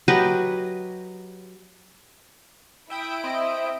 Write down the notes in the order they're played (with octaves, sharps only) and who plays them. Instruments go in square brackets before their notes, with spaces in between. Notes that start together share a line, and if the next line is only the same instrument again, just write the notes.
[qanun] F#3 G4 B4 D#5
[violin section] E4 D7 [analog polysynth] E5 G5 D#6
[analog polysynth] C4 D#5 [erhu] E5